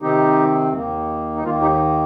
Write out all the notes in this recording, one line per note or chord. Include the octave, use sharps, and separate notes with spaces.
C3 D#3 C4 D#4 G4
D#2 D#3 A#3
D#4
D#2 D#3 A#3 F4
D#4 G4